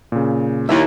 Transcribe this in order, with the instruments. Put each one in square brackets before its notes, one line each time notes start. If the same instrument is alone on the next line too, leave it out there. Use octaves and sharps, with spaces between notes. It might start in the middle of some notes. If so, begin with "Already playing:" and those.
[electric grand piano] A#2 C#3
[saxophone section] D#2 [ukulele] E4 E5